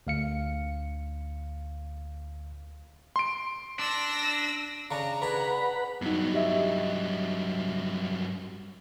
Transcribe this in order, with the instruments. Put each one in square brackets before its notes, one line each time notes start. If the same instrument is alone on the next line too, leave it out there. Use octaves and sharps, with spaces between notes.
[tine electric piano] D2 F5 C#7
[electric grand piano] C6 D7
[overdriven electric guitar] D4 [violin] E6 A#6
[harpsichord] C#3 D4 [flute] A#5
[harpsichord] D4 G#4 [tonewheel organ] B4 F#5 B5
[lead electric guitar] G2 F#3 [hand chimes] B3 D#4
[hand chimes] G4 D#5 E5